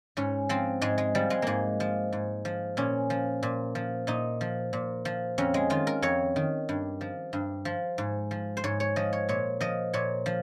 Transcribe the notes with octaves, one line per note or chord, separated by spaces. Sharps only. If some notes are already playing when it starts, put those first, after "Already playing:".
G#2 C#4
F3 C4
G#2 G#3
G#3
F3 G3
G#3
G#2 G#3 A#3
F3
G#2
F3
A#2 C#4
F3
A#2
F3
A#2 D#4
F3
A#2
F3
F2 C#4
G#3
D#3 F4
A#4
F2 C#5
D#3
G2
F3
G2
F3
G#2
F3
C5
G#2 C#5
C#5
F3 D#5
C#5
A#2 C#5
F3 D#5
A#2 C#5
F3